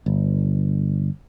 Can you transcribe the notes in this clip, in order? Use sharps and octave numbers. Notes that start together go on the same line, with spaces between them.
G1